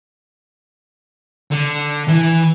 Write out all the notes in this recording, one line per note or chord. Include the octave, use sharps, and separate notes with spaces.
D3
E3